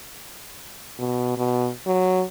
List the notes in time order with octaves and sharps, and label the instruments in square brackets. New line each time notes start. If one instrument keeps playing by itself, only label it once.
[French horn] B2
B2
F#3